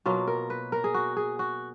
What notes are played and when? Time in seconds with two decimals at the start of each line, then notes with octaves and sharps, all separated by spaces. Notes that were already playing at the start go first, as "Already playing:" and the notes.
0.05 B2 F#3 A#3 F4
0.27 A#4
0.50 B4
0.72 A#4
0.84 G#4
0.94 F#4
1.17 G#4
1.39 F#4